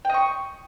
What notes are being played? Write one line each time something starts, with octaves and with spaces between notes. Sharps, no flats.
D#5 G5 C#6